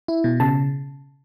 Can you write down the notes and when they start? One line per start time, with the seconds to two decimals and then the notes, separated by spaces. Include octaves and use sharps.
0.08 E4
0.24 B2
0.40 C#3 A5